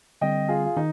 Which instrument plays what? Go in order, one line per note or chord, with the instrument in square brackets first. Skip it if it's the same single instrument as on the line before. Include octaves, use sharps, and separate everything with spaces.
[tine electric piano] D3 G3 C4 [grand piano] D#5 G5
[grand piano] F4 G#4
F4
[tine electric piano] D#3 [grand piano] D#4